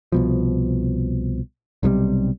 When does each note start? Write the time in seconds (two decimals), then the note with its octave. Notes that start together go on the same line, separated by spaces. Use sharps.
0.12 C2 B2 F3
1.83 B1 C3 D#3 G3